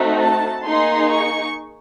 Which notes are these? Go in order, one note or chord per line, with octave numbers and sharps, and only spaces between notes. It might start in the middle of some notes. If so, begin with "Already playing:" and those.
Already playing: A3 C4 D#4 F#4
A5
A#3 D#4 G#4 C6
C#6